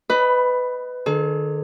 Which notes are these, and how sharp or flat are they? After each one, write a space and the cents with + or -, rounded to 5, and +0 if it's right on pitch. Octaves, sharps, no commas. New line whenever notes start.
B4 +20 D#5 +0 B5 +0
D#3 -45 A4 -45